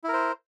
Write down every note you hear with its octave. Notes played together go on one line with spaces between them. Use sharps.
E4 A#4 C5